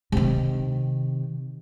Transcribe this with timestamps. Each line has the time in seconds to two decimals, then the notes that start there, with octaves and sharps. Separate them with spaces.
0.12 C3 D#3